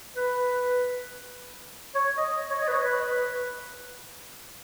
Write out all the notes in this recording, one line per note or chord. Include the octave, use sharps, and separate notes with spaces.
B4
C#5
D#5
C#5
D#5
B4
C#5
B4